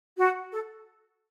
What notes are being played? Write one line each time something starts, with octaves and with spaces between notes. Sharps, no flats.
F#4
A4